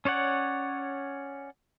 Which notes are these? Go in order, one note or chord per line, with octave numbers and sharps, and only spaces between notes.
C#4 C#5 D5 F#5